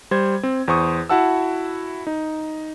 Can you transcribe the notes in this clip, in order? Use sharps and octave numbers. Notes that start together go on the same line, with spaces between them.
G3 C5 G#6
C4
E2 C5 C#6 D#6
E4 F#4 F#5 A5 E6
D#4